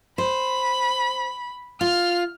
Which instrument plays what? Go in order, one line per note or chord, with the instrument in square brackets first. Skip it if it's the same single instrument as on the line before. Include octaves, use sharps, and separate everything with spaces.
[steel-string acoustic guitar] C5 [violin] B5
[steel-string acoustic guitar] F4 [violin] F6